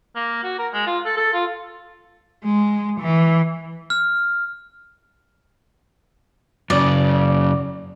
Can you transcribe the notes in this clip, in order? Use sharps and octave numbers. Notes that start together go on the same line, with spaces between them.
A#3
F#4
A#4
G#3
F4
A4
A4
F4
G#3
E3
F6
F#2 C#3 D5